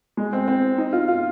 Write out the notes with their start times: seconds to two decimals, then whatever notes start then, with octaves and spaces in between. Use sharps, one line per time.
0.17 G#3
0.33 C4
0.48 C4
0.78 D#4
0.93 F4
1.08 F4